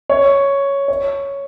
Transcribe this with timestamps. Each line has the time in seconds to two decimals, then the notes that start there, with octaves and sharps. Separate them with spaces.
0.10 C#5
0.88 C#5